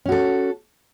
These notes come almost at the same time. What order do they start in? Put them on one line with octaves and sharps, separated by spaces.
C#4 F#4 A4